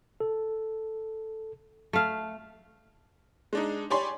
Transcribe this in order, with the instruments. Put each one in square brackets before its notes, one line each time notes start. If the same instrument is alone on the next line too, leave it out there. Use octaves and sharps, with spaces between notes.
[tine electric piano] A4
[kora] A3 F5
[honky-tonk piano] G#3 D4 D#4
G4 C#5 D5 G#5 B5 C6